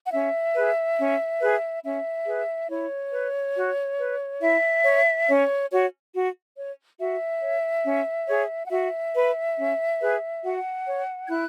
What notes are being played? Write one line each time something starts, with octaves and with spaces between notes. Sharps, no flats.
F#5
C#4 E5
G#4 B4
C#4
G#4 B4
C#4 E5
G#4 B4
E4 C#5
B4
F#4
B4
E4 E5
C#5
C#4 C#5
F#4 C#5
F#4
C#5
F#4 E5
C#5
C#4
G#4 C#5
F#5
F#4 E5
B4
C#4
G#4 B4
F#4 F#5
C#5
G#6
E4 F#6